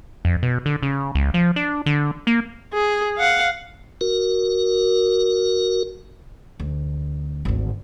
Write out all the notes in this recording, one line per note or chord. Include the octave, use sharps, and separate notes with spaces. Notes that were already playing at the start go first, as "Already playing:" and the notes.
F2
B2
D3
C#3
C#2
F3
D4
D3
A#3
G#4
F5 F#5
F#4 A#4
D2
G#1 D2